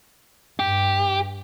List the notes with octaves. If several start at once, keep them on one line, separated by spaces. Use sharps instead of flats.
G2 G4